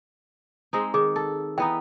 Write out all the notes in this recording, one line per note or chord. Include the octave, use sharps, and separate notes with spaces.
G#3 C4 D#4
D#3 G#4
A4
E3 B3 D#4 G5